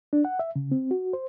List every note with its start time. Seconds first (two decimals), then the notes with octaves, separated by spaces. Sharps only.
0.13 D4
0.25 F#5
0.39 E5
0.56 C#3
0.71 C4
0.91 F#4
1.13 C5